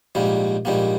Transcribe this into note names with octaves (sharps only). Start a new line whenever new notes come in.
A#1 G#2 G3 A#3
A#1 G#2 G3 A#3